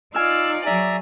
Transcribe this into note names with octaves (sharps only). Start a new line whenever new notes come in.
D#4 F4 D5 G#5 E6 F6
F#3 G#4 D5 E5 A#5